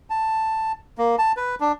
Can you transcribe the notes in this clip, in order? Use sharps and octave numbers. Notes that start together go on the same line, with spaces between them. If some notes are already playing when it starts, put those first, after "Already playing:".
A5
A#3
A5
B4
D4